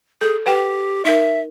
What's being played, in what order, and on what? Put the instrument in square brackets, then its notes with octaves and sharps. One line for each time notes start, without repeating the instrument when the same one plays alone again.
[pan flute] G#4 [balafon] A4
[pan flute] G4 [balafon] B4 F#5 G5
[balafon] D#4 A#4 [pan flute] E5